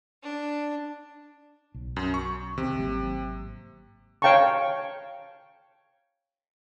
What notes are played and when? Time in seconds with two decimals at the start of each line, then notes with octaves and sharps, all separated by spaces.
0.23 D4
1.74 B1
1.96 F#2
2.14 C#6
2.58 D1 C3 D#3
2.78 G#1 F#3 A#3
4.22 C#5 F5 G5 A5 A#5 C#6